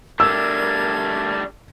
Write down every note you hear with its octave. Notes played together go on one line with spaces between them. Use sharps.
G3 A3 D4 A#4 E6 G#6